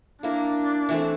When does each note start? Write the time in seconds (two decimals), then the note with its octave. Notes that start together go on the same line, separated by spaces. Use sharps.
0.23 A#3 D4 E4 A#4
0.89 E3 A3 C4 E4